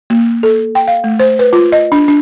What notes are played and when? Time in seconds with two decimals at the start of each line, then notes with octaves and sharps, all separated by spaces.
0.10 A#3
0.43 A4
0.75 G5
0.88 F5
1.04 A3
1.20 C5
1.39 B4
1.53 F4
1.72 D#5
1.92 D4
2.08 D4